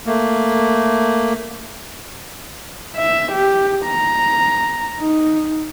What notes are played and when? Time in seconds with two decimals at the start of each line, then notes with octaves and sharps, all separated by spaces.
0.06 A3 A#3
2.97 E5
3.33 G4
3.86 A#5
5.00 D#4